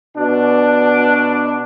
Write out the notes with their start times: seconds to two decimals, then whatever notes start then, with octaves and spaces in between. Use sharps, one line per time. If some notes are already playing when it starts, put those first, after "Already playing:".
0.17 B2 D4